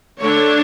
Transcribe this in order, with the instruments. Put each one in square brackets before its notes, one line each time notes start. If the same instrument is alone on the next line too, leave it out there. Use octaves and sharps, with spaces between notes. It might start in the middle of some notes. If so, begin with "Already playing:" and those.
[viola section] D3 A3 D4 C#5